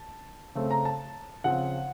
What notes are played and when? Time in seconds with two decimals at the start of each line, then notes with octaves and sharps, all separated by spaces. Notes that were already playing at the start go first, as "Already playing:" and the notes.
Already playing: A5
0.55 C#3 A3 C4
0.71 A#5
0.85 A5
1.44 C#3 F3 C4 F#5